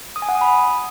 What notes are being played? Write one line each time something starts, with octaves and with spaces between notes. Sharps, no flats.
D#6
G#5
F#5
D#6
B5